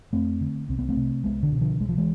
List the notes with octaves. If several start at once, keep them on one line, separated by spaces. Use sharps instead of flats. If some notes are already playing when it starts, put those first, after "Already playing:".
F2 A3 C4
D3
C2 C4
B3
A3 C4
C3
C2 G#3 B3
D3
B2
D3 F3
C2 G#3
F3
E3 G#3